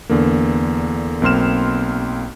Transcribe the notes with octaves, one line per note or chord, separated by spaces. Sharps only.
E2 D3 A#3
B1 A#3 C4 C6 F6 E7